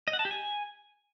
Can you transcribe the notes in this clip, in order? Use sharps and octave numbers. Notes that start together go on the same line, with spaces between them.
D#5
F#5
A5
G4
G#5